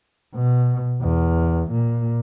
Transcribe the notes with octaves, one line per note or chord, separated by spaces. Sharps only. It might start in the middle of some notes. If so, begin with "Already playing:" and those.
B2
E2
A#2